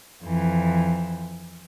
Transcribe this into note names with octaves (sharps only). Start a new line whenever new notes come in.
F2 E3